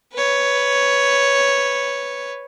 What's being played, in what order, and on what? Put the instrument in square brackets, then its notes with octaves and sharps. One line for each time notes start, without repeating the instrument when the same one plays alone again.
[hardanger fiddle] B4 C#5